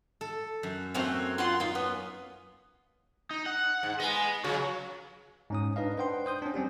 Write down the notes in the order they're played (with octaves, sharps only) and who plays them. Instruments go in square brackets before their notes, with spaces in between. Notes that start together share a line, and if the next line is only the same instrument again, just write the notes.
[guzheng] A4
F#2
[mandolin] A3 C4 C#5 [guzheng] A#3 F#4
[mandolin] F4 F#5 C6
[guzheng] C#4 [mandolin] D#4 F4
[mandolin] B3
[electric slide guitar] D#4
F#5
[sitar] G#2
[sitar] B3 [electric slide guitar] D#5 G#5
[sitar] C#3 [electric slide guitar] F#3 F#4
[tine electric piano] G#2 C#4 D#6
D4 D#4 B4 D#5 F5
D4 B4 C5 F#5 G5 C6
C5 D#6 G6
C#4 D4
G3 C4 C#4 G4